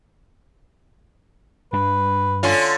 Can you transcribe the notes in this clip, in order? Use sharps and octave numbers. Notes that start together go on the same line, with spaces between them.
G2 D4 B4
D3 C#4 F4